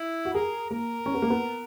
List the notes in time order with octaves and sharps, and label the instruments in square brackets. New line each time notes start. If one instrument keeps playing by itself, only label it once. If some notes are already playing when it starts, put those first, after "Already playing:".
Already playing: [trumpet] E4
[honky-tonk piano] F#4
[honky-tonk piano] G#4 [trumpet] A#4
[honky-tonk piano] A#3 [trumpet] A#4
[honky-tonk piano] C#4
B3
A#3
B3